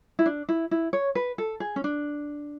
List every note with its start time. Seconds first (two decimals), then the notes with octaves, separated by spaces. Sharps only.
0.19 E4
0.26 D4
0.49 E4
0.71 E4
0.93 C#5
1.15 B4
1.38 A4
1.60 G#4
1.76 C#4
1.84 D4